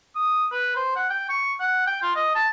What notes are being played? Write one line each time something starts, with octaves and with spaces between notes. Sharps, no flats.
D#6
B4
C5
F#5
G5
C#6
F#5
G5
F4
D#5
A5